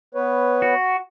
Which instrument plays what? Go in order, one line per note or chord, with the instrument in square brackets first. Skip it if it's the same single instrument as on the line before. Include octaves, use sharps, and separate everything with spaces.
[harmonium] B3 B4 C#5
[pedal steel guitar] F#4